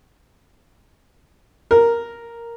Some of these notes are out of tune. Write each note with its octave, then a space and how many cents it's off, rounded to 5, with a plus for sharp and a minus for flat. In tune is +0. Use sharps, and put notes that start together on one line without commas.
A#4 +0